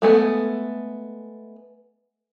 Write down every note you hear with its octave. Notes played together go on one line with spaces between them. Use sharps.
G#3 A3 B3